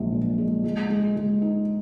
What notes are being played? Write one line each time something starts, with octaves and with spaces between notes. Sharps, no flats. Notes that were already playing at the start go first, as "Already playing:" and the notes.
Already playing: A#1 F#3 G#3
A#2
G#3
G#3
G#3
G#3
D#4